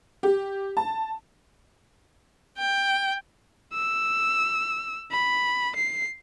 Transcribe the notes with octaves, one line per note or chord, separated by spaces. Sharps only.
G4
A5
G5
E6
B5
C7